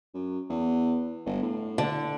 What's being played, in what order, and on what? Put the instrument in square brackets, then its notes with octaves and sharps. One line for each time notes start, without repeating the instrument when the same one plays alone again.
[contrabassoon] F#2
E2
G1
A2
[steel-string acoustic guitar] D3